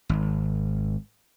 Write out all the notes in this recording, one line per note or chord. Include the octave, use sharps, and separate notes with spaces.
G#1